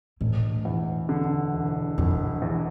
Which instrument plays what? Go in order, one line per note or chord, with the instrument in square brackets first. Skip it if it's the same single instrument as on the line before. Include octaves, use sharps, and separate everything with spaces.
[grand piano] E1 [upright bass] A2
[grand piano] E2
D3
E1
[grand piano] E1 [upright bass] F2
[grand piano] E2